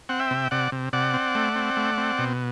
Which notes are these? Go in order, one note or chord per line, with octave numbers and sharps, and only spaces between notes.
C4 F#5
E5 G5
C3
C3 D5 F#5
C3
C3 D5 F#5
C4
A3
C4
A3
C4
B2